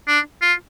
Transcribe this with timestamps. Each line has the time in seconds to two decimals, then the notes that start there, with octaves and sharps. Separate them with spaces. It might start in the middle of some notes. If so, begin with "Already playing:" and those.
0.08 D4
0.42 F4